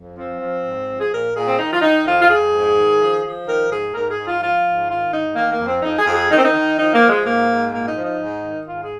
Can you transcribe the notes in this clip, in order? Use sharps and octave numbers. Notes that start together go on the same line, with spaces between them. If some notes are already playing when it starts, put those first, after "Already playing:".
Already playing: F2
F3 C4
F3
G#2
F3
G#4
A#2 A#4
A#2 G#4
C4
D#3 D#4
F4
D#3 D#4
F2 F4
F4
F2 G#4
G#2
D#3
F3
F3
D#3 A#4
G#2 G#4
G#2 A#4
G#4
G#2
F4
F3 F4
G#2
D#3 F4
G#2 D#4
D#3 A#3
A#3
F2
C4
F2 D#4
G#4
F2
G#4
D#3 D#4
C4
D#4
D#3
F3 D#4
A#3
F3
G#3
G#2 A#3
G#2
A#2 A#3
D#4
F3
D#4
G#2
D#3
G#2 F4
G#4